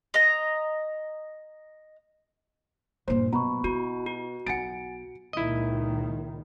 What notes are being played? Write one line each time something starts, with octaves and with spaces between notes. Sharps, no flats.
D#5 A#5
G2 A#2 C5
B2 F#3 A#5 B5 C#6
E4 F#4
F#4
B1 F#5 G#5 A6 C#7 D7
C#2 A#2 D#3 E4 D#5